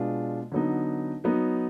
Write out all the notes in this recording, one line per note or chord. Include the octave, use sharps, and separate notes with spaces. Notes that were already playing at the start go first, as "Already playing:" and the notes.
Already playing: B2 G#3 D4 F4
D3 F#3 B3 D#4
F#3 B3 D#4